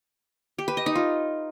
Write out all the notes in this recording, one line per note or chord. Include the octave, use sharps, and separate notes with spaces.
G4
B4
D#5
D#4
F4